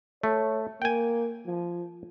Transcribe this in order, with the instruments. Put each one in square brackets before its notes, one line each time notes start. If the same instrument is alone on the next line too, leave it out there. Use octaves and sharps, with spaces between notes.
[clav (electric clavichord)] A3 [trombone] C#5
[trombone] A#3 [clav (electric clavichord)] G5 G#5
[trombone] F3